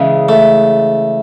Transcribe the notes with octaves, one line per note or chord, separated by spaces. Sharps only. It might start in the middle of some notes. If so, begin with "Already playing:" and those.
Already playing: C#3 E3 G#3
A3